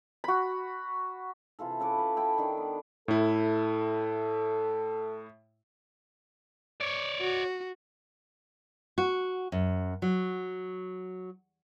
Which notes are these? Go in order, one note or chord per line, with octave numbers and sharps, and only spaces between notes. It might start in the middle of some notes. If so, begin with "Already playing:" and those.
F#4 B5
C3 E3 F4 A4
C#4 A4 B4 D6
B4 F5
E4 G5 A5 B5
D#3 D4
B3
A2 E4 A4
C#5 D5
F#4
F#4
F#2
F#3